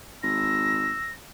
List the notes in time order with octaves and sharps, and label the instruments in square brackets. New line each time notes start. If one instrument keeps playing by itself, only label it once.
[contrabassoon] G#1 [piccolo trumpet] E6 [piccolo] A#6